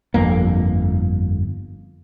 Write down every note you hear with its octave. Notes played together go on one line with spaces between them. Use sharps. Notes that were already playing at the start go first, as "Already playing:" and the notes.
G1 F2 A#3